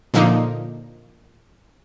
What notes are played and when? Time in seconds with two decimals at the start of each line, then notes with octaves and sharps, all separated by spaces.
0.14 A#2 D3 F3 A#3 D#4